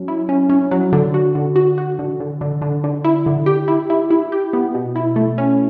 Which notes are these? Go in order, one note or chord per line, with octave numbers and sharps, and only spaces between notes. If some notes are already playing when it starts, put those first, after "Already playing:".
Already playing: F#3 C#4
E4
C#4
C#4
F#3
D3
F#4
D3
F#4
F#4
D3
D3
D3
D3
D3
E4
D3
G4
E4
E4
E4
G4
B3
B2
E4
A3
C#4